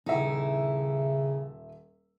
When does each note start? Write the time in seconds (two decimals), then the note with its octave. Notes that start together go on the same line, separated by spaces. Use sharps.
0.06 D#1 C#3 D#4 E4 E5